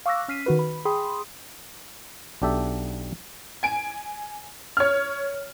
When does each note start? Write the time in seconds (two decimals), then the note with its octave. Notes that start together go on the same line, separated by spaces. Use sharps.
0.06 F5 C#6 D6 E6 F#6 A#6
0.28 C#4 F6 B6 C7 D#7
0.46 D#3 F#4 B4
0.59 B5
0.85 G#4 G5 B5 C6 D#6
2.42 B1 D4 G4 A4 E5
3.63 G#5 D7
4.77 C#5 F6